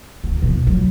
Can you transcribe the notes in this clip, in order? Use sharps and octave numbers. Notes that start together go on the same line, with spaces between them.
D2 C3
B1 B2
F#3 A3